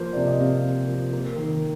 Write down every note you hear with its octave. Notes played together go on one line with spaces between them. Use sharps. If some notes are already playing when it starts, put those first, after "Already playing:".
Already playing: F3 A#3 C5
C3 D5
D#5
C3 F5
A#3
F3
A#3
D#3